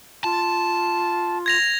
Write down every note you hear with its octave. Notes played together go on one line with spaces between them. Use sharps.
F4 A5
G#6 A#6 F7